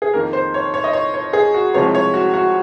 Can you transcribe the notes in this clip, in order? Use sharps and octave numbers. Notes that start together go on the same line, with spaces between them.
G#4
F2 D#3 A#3 A#4
C5
C#5
C#5
D#5
C#5
C#5
G#4
F#4
C2 C3 F3 G#3 C4 C#5
C#5
F#4
F#4